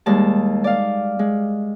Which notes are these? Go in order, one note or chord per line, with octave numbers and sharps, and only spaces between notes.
D#2 G3 G#3 A5
D5 F5
G#3